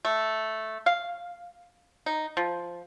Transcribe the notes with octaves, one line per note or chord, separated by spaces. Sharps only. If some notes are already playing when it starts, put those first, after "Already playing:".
A3
F5
D#4
F3